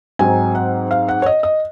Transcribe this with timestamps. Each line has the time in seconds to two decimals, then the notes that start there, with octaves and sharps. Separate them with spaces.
0.19 G#2 F#3 C4 D#4 G#5
0.55 F#5
0.91 F5
1.09 F#5
1.22 C#5
1.26 D#5
1.43 D#5